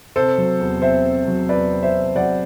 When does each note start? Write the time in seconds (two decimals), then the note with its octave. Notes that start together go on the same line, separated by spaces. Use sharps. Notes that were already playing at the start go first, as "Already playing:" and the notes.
0.16 C3 A4 C5
0.38 F#3
0.60 E2
0.82 C4 C5 E5
1.05 C3
1.28 F#3
1.49 E2 B4 D5
1.72 C4
1.83 C5 E5
1.94 C3
2.16 F#3 D5 F#5